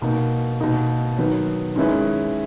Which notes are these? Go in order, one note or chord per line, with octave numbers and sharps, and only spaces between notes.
B2 A#3 D#4
B2 A#3 D#4 A#4
D#3 F#3 B3
D#3 G#3 C#4 E4 B4